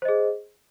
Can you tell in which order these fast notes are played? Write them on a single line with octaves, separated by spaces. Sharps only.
C5 D#5 G#4